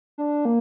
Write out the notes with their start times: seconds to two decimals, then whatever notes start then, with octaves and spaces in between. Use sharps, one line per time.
0.18 D4
0.45 A#3